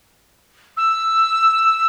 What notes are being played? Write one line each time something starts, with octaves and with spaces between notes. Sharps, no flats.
E6